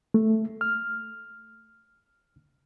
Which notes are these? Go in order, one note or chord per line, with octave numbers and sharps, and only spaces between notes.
A3
F6